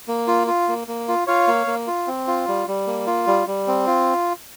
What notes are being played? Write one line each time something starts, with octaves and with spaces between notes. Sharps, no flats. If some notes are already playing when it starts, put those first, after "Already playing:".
A#3
F4
F4
A#3
A#3
F4
F4 C#5 F5
A#3
A#3
F4
C4
F4
G3
G3
A#3
F4
G3
G3
C4
F4